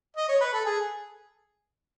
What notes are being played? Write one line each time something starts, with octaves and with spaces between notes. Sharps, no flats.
D#5
C#5
B4
A4
G#4